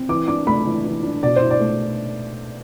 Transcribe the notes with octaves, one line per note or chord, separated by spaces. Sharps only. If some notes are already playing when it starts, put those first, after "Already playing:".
Already playing: C4
E3 D6
D4 D6
A3 B5
E3
E3
D4
B2 D5
C5
E4
D5
A3